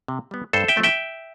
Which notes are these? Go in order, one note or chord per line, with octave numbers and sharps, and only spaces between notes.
C3
G3 B3
G2 A4 C5
E5 G5
F3 A3 C4
E5 G5